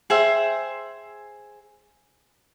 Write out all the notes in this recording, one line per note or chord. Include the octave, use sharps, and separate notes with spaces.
G#4 C5 E5 G5